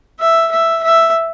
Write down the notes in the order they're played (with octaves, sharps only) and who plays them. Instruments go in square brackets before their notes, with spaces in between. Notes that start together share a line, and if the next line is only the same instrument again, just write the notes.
[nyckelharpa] E5
E5
E5